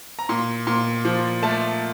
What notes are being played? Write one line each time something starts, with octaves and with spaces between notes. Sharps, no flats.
A#5
A#2 C6
A#2 C6
F3
A3 A5